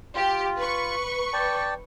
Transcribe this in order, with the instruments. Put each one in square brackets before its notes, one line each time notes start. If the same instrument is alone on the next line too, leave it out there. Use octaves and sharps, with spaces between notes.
[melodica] F4 [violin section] G4
[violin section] B4 C#6
[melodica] D5 G5 A5